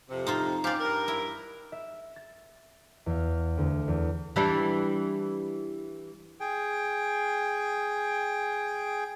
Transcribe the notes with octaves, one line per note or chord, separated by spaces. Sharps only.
F2 C3
D#4 F4 C5
C#4 G4 C5 D5 F5
G2 A#4
E4
E5
A6
E2 F5
D2
E2
E3 G3 D4
G#4 G5